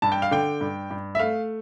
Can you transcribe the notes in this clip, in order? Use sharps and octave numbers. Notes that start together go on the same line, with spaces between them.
G2 A5
G5
F5
D3 G5
G2
G2
E5
A3 F5